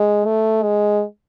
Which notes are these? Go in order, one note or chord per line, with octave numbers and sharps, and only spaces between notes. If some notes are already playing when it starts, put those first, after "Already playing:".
Already playing: G#3
A3
G#3